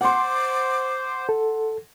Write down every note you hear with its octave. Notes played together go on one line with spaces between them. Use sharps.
C5 F#5 C6 D6
A4